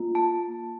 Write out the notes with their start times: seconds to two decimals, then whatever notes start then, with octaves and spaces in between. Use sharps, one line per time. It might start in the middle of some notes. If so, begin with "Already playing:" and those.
Already playing: A#3 F4
0.15 A5